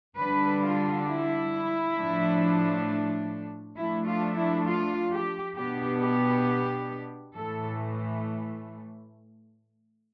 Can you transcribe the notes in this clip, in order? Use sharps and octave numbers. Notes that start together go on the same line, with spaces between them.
D3 G3 D4 B4
F4
E4
A2 F3 A3 D4
F3 A3 D4 E4
F4
E4
F4
G4
B2 B3 D4 G4
G4
A2 E3 A3 A4